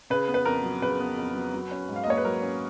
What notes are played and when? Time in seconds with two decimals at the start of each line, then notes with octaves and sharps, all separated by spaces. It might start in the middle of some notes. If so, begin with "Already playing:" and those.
0.10 C#3 B4
0.28 B3
0.34 B4
0.45 F2 A#4
0.63 F#3
0.82 C#3 B4
1.00 B3
1.18 F2
1.35 F#3
1.54 F#3
1.71 C#4
1.89 G#2
1.96 F5
2.04 D#5
2.07 A#3 C#5
2.17 B4
2.25 F#3 A#4
2.42 C#4